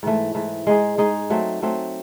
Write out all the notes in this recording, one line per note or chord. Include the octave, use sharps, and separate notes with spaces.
G#2 E3 A3
G#2 E3 A3
G#3 D#4 G#4
G#3 D#4 G#4
F#3 A3 C4
F#3 A3 C4